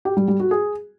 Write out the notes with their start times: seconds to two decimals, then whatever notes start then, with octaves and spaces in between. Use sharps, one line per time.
0.05 G4
0.17 G3
0.28 G3
0.40 F#4
0.51 G#4